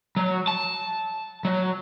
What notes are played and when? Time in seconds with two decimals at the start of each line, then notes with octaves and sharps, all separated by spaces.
0.16 F#3
0.47 A5
1.45 F#3